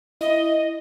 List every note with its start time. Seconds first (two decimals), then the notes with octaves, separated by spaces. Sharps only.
0.21 E4 D#5